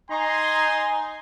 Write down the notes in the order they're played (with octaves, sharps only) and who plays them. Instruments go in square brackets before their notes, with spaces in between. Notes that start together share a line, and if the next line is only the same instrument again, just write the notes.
[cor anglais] D#4 [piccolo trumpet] G#5 [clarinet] A#5 [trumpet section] C6